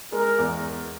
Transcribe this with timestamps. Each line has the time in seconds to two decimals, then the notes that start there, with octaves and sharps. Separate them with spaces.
0.12 G#3 A#4
0.38 E2